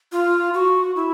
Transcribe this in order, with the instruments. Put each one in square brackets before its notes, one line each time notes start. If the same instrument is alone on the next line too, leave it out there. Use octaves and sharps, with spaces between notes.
[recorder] F4
F#4
E4